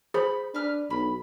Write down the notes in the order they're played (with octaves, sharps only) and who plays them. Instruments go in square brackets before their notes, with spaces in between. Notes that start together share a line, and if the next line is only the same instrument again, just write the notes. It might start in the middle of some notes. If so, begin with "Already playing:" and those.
[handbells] G#4 C5 [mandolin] B5 G6
[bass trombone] D4 [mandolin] B4 F6
[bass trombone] B1 [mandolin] B5